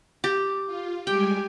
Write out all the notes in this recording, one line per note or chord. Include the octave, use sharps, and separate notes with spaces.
G4
F4
G3 G#3 G4 G5 G#5